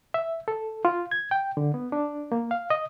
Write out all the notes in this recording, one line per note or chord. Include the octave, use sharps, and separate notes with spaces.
E5
A4
F4
G#6
G5
D3
B3
D4
A#3
F5
D#5